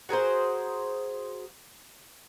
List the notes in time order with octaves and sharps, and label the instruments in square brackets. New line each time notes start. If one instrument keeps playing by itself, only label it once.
[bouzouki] F#4 G#4 A#4 C5